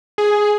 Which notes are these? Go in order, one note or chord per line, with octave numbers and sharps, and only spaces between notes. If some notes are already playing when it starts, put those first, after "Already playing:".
G#4